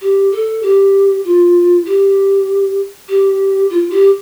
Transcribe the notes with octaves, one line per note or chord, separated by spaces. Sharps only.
G4
A4
G4
F4
G4
G4
F4
G4